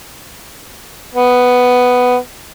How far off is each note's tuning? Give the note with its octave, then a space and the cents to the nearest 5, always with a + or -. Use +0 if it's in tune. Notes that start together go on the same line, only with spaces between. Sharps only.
B3 +5